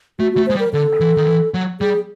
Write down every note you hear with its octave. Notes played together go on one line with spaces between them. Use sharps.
A3 F#4
F#4
A3
G#3 C5
G3
A#4
D3 A4
E3
D#3
E3
F#3
G3 G#4